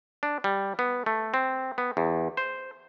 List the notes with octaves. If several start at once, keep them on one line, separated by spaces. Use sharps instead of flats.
D4
G3
B3
A3
C4
B3
E2
C5